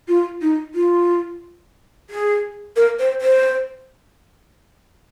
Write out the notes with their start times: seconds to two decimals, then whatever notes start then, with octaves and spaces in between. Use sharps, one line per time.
0.08 F4
0.42 D#4
0.75 F4
2.10 G#4
2.76 A#4
2.99 C5
3.21 C5